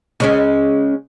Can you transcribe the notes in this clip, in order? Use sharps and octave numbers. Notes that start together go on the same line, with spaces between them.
C#3 G#3 C#4